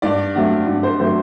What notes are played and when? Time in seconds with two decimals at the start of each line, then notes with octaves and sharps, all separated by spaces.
0.02 G2 D5
0.35 D3 F#3 A3 C4 F#5
0.67 G2
0.83 C5
1.00 D3 F#3 A3 C4 C5